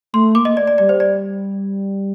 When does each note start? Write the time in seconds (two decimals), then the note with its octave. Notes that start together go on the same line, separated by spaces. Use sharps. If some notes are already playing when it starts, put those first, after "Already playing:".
0.13 A3 C6
0.35 A#3 D6
0.45 D#5
0.57 D5
0.67 D5
0.78 G3 D5
0.89 C5
1.00 D5